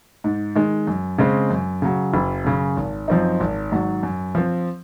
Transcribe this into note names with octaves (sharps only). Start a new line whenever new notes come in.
G#2
D#3 G#3
F#2
C#3 G#3 C4
F#2
C#3 F#3
F#1
F#2 C#3
G#1
F#2 F3 C4 D#4
G#1
G#2 D#3 F#3
F#2
F3 C4